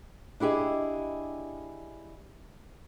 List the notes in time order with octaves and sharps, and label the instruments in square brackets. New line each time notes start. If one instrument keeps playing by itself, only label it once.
[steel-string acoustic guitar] D4 E4 G4 G#4 D#5